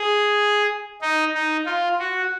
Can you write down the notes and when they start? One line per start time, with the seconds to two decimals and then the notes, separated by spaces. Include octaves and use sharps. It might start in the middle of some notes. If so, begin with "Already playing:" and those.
Already playing: G#4
1.02 D#4
1.34 D#4
1.66 F4
1.99 F#4